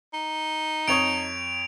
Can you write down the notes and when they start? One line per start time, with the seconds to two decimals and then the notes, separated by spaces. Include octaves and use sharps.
0.14 D#4
0.88 F2 C#5 D#6 D7 F7